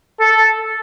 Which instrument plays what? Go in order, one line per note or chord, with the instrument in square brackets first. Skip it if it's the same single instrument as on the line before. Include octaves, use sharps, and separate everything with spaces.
[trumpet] A4